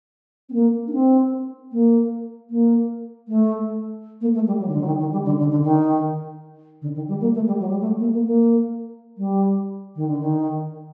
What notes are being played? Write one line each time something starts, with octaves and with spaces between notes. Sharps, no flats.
C4
A#3
D4
C4
A#3
A#3
A3
A#3
A3
G3
F#3
D#3
D3
F#3
D#3
D#3
G3
D3
D3
D3
D#3
D3
D#3
G3
A#3
A3
G3
F#3
G3
A3
A#3
A#3
A#3
G3
D#3
D3
D#3